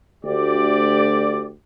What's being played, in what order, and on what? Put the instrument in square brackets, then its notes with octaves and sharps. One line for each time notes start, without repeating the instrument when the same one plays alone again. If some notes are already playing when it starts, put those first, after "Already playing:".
[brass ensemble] D2 G4 D5